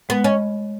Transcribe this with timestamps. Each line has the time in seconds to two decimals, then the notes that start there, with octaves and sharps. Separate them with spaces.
0.09 G#3 B3
0.24 C#4 D#5